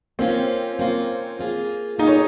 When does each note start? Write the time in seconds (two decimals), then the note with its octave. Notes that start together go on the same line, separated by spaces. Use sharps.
0.19 A#3 C4 C#4 F4
0.79 A#3 C#4 F4
1.39 A#3 F4 G#4
1.98 A#3 D#4 F4 G#4
2.08 C#5